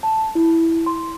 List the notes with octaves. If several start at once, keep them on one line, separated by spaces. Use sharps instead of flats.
A5
E4
C6